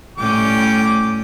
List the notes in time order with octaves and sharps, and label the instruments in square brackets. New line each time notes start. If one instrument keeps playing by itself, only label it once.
[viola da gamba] A2 G3 C#4 [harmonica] G5 D6